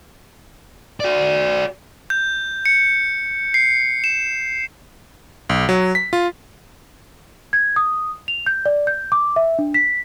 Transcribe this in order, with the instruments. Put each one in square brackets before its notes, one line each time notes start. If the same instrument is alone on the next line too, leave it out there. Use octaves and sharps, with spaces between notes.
[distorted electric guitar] F#4 D5
[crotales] G6
C#7
C7
E7
[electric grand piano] B1
F#3
B6
F4
[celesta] G#6
D#6
F7
G6
D5
G6
D6
E5
D4
B6